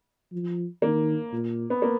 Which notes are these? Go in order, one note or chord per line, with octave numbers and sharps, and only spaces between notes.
F3
D#3 A#3
A#2
B3
A#3